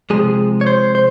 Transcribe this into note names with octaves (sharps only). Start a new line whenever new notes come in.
C3 F3 G#3 G#4
C#5
C5
C5